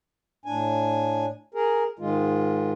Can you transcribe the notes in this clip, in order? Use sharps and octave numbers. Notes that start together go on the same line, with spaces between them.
A2 D4 G#5
G#4 A#4
G#2 D#3 G#3 F4